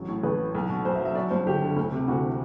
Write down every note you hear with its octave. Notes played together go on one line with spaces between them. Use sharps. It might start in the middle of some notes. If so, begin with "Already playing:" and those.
Already playing: A1 F#3
A2
A1 B4
E3
B1
B2
B1 C5
E5
F#3
E5
F#3 D5
G2 C5
G1 G4
D3
D2
C3
D2 F#4
E3